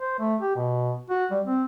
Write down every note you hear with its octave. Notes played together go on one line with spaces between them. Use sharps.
C5
A3
G4
B2
F#4
G3
C4